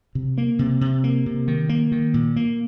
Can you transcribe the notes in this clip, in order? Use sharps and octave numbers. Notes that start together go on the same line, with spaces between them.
C3
A#3
C3
C3
A#3
C3
D#3
A#3
D#3
A#2
A#3